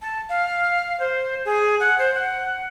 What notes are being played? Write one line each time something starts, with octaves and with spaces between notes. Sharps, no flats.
A5
F5
C5
G#4
F#5
C5
F#5